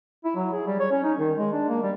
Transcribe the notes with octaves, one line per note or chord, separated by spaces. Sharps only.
E4
F#3
G#4
G3
C#5
C#4
D#4
D#3
G#3
D4
A#3
G3